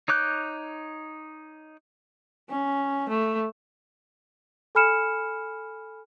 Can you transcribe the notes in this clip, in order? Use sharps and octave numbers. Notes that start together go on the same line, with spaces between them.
D#4 C#5 D6 F#6 G6
C#4
A3
A4 G#5 B5 F6 C#7 E7